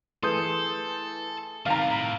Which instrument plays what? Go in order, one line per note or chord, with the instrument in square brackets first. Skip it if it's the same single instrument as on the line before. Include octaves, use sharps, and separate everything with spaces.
[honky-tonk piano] E3 [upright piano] A3 G#4 [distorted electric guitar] A4 [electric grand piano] C6 D#6 G6
[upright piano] C3 D#3 [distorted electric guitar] G3 B3 [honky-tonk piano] F5 A#5
[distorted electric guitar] A2